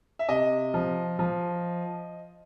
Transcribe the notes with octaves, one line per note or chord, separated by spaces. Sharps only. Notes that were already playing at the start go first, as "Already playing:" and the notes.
E5
C3 D#5
F3
F3